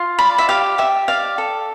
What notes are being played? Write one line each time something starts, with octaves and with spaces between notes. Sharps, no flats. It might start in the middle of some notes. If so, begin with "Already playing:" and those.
Already playing: F4
D5 B5
E5
G4 F5
G4 E5
D5 F5
A4